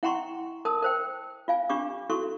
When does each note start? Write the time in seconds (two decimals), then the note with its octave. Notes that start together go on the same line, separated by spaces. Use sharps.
0.03 E4 F#5 G5 A#5 C6 C#6
0.65 A#4 A5 D#6
0.82 A#4 C5 G5
1.48 F4 F5 G#5
1.70 D4 F4 G4 C#6 D6
2.10 E4 F#4 A4 C#6